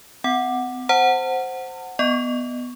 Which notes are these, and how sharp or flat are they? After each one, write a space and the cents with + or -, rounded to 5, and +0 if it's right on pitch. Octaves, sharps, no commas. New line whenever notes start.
C4 -45 F#5 +0
C5 +0 F#5 +0 A5 +45
B3 +0 D#5 -30 C#6 +0